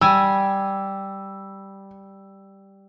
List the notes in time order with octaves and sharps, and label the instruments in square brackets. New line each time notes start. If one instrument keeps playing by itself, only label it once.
[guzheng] G3 G#5 [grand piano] E6